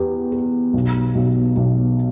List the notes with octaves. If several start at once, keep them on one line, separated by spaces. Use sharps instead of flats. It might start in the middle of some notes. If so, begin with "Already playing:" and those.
Already playing: E2 B3 G4
G4
B1
B1
B1